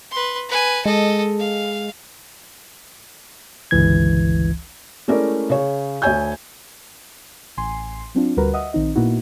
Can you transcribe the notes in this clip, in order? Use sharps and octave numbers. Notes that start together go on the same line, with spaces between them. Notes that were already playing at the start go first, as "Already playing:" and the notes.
B4 C6
B4 G#5
G#3 A4 D#5
F5
G1 C#2 E3 G#6
G#3 A3 C#4 E4 A#4 D5
C#3 C#5
D2 C#5 G#5 G6
A1 G#5 C6 C7
F#3 C4 D4 F4
D2 G3 F#4 A#4 B4 A#5
D#5 E5 F#5 D#6
A#1 D#3 C4 D#4 D#5
A#2 A#3 B3 D#4 E4 F#4